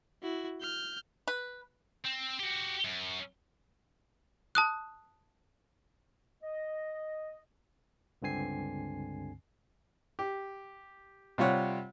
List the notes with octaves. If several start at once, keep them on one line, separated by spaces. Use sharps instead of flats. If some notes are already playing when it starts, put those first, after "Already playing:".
E4 F#4
F6 G6
B4
C4
F#4 G4
F#2
A5 D#6 F#6
D#5
C#2 G2 D3 C4 G#5 C7
G4
C3 G3 F4 C#5 F#5